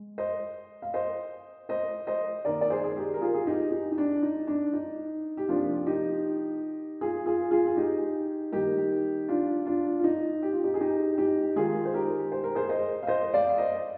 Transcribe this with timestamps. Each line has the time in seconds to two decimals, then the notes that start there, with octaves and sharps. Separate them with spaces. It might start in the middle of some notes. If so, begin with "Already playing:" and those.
Already playing: G#3
0.18 C5 D#5
0.82 F5
0.94 C5 D#5
1.69 C5 D#5
2.07 C5 D#5
2.45 D#3 A#3 A#4 D5
2.61 D5
2.70 G#4 C5
2.84 G#4
2.97 G4 A#4
3.14 A#4
3.21 F4 G#4
3.34 G#4
3.46 D#4 G4
3.71 D#4
3.92 D#4
3.98 D4
4.22 D#4
4.47 D4
4.73 D#4
5.37 G4
5.48 C3 F3 A#3 D4 F4
5.86 D#4 G4
7.01 F4 G#4
7.26 F4 G#4
7.51 F4 G#4
7.67 G#4
7.76 D#4 G4
8.52 D#3 G3 A#3 D#4 G4
9.28 D4 F4
9.66 D4 F4
9.99 F4
10.04 D#4
10.42 G4
10.53 F4
10.63 D#4 G4
10.74 G#4
10.81 D#4 G4
11.18 D#4 G4
11.56 D#3 G#3 F4 G#4
11.85 C5
11.94 G4 A#4
12.32 C5
12.44 A#4
12.55 G#4 C5
12.69 C5 D#5
13.03 F5
13.07 C5 D#5
13.34 D5 F5
13.49 F5
13.58 C5 D#5